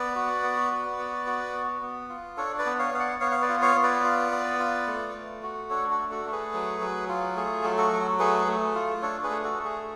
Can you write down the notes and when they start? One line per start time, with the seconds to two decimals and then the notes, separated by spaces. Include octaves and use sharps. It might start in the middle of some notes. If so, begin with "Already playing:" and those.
Already playing: B3 B4 D5
0.15 F#4
0.43 B3
0.71 F#4
0.99 B3
1.26 F#4
1.54 B3
1.82 B3
2.09 F4
2.37 D4 A4 C#5
2.58 B4 D5
2.66 B3
2.79 C#5 F5
2.93 B3 F5
2.99 D5 F#5
3.21 B3 C#5 F5
3.31 F5
3.42 B4 D5
3.49 F4
3.62 C#5 F5
3.76 B3
3.83 B4 D5
4.04 F4
4.32 B3
4.60 F4
4.87 A3
5.15 A3
5.43 F#4
5.70 D4 A4 C#5
5.90 F#4 A4
5.98 A3
6.11 F#4 A4
6.26 A3
6.32 G#4 B4
6.54 F#3
6.81 F#3
7.08 F4
7.36 A3 G#4
7.64 F#3
7.78 F#4 A4
7.92 F#3
8.19 A3 G#4 B4
8.48 A3
8.75 F4
9.02 D4 A4 C#5
9.23 G#4 B4
9.30 A3
9.44 F#4 A4
9.58 A3
9.65 G#4